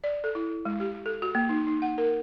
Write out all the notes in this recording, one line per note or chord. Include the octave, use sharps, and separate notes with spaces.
D5
A4
E4
G#3
G4
A4
F#4
A#3
D#4
D#4
F#5
A#4